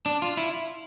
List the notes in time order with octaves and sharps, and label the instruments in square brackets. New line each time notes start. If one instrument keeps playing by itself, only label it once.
[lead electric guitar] D4
F4
E4